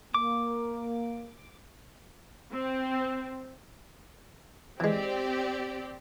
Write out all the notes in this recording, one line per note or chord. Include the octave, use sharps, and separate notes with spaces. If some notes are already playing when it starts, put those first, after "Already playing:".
A#3 D6
C4
E3 G#3 C4 G4 D5